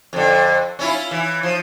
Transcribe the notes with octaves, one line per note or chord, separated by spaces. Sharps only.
F2 D3
C#4 E4 F4
E3
F3